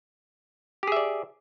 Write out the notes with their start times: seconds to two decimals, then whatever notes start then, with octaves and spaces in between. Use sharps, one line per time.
0.83 G4
0.87 G#4
0.92 E5
0.97 D5